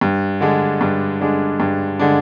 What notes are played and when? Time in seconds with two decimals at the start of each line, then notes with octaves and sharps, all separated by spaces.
0.01 G2
0.41 D3 G#3 D4
0.81 G2
1.21 D3 G#3 D4
1.60 G2
1.99 D3 G#3 D4